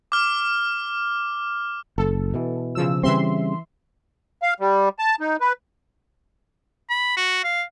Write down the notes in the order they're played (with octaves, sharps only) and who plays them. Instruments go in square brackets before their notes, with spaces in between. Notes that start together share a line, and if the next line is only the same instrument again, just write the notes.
[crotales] D6 F6
[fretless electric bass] F#1 [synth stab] A4
[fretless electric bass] B2 E3
[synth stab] C#3 F3 E6
[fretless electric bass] C#3 G3 C4 [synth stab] E3 E5 C6
[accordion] F5
G3
A5
D#4
B4
[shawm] B5
F#4
F5